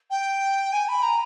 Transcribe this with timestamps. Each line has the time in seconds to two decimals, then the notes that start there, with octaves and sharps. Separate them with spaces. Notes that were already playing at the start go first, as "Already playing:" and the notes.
0.10 G5
0.72 G#5
0.88 B5
1.02 A#5